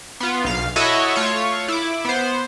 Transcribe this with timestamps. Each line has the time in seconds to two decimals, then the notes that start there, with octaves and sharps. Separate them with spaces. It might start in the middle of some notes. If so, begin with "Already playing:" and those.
0.20 B3 F4
0.44 B1 F5
0.76 E4 F#4 A4 C#5 D#5 E5
1.16 A3 F4 C#5
1.68 E4 D6
2.05 B3 C5